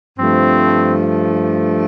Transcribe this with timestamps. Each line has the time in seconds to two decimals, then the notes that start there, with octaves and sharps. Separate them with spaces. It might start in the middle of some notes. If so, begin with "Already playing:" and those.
0.17 G2 F3 A3 C4